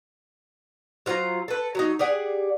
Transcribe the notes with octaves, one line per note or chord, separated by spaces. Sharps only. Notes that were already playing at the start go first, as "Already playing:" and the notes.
F#3 F4 C5 A#5
A4 B4
F#3 B3 D#4
G4 G#4 D5 F#5